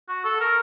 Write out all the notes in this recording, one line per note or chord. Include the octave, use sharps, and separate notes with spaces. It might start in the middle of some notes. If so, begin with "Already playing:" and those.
F#4
A4
A#4